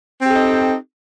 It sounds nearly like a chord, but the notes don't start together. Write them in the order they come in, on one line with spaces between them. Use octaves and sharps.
C4 G4 A4 D#4